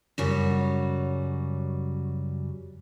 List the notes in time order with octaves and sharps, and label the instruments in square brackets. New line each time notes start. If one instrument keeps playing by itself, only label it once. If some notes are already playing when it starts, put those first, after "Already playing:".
[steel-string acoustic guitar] F#2 C#3 G3 F#4 C#5